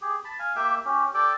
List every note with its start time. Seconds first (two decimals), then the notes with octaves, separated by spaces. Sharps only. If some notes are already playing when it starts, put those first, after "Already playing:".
0.02 G4 G#4
0.25 A5 B5
0.39 F5 G#5
0.56 A#3 G4 E5 G5
0.85 C#4 G4
1.14 G4 A4 D5 G5